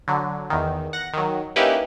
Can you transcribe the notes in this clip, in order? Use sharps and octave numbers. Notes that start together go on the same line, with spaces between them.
D3 F#3
E2 D#3
F#5 A#6
D#3 F#3
A#3 C#4 D#4 E4 G4 B4